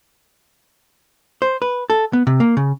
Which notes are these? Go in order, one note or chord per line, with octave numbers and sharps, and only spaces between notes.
C5
B4
A4
B3
C3
A#3
C#3